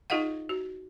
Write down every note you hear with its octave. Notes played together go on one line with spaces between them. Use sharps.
D#4 F4 G#4 D#5 F5 F#5
F#4